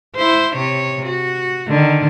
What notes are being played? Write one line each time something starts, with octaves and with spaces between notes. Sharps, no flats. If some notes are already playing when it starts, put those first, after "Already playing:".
E4 C5
C3 C#5
F#4
D3 D#3